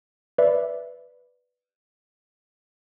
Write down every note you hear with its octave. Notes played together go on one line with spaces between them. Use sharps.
B4 D5 E5